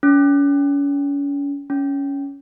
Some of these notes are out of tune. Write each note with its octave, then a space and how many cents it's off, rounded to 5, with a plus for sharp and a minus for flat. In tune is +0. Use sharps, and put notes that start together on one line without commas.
C#4 +35
C#4 +10